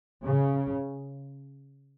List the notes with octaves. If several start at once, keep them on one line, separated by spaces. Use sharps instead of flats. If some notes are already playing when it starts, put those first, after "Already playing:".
C#3